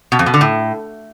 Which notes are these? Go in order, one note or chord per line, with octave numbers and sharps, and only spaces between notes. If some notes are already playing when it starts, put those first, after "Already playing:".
B2
F2
B2
D3
A2